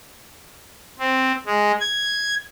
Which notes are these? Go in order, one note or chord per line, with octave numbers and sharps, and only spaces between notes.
C4
G#3
G#6